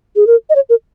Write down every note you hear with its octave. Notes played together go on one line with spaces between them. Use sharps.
G#4
A#4
D#5
C#5
A#4